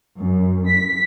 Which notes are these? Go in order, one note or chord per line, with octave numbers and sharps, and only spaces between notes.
F#2
B6